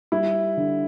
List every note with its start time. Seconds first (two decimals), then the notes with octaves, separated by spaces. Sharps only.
0.12 G3 E4
0.57 D3